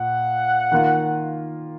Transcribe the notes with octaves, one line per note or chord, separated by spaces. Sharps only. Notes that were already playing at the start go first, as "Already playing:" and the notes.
Already playing: A#2 F#5
D#3 A#3 F4